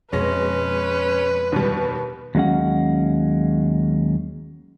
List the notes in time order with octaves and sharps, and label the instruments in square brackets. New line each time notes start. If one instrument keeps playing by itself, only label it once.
[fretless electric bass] F2 [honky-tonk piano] B2 G#3 A#6 [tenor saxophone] C#4 [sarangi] B4
[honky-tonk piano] D#2 B2 G3
[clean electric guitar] D#2 F#3 G#3 C#4 F#5